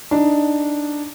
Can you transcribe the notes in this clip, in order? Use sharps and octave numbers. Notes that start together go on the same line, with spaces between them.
D4 D#4